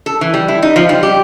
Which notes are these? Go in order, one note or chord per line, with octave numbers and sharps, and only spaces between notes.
A4
E3
G3
E4
D#4
F3
G3
G4